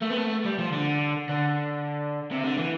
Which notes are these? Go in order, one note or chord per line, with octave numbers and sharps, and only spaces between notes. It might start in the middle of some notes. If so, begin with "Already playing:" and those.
A3
B3
A3
G3
F3
D3
D3
C3
D3
E3